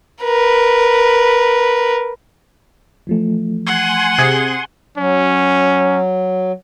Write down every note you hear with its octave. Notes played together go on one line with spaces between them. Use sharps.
A#4 B4
E3 F3 A3
F#5 G#5 C6
C3 G#4 D#6
F#3 C#4